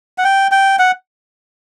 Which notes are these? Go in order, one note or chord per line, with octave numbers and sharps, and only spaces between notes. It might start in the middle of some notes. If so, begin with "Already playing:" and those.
F#5
G5
G5
F#5